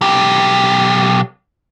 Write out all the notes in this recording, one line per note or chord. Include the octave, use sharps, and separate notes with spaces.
B1 G4